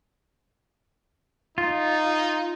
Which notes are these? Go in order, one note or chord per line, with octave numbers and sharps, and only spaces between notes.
D#4 F4